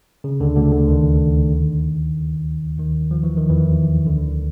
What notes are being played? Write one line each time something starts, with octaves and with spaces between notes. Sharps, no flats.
C#3
D2 D3
D2 D3
D2 D3
D#2 D#3
D#2 D#3
F3
E3
D#3
E2 E3
D2 D3